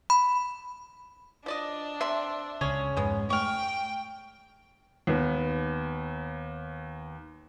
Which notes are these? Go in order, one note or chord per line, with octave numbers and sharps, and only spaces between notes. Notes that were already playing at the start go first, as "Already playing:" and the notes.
B5
F3 D4 D5 D#5
C3 E5 C6
C#2 C#3 C#4 G#4 C#5
F2 G#2 G#3 B3
A3 G5 C#6 F6
D#2 B3